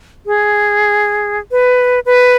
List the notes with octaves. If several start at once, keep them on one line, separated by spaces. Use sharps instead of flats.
G#4
B4
B4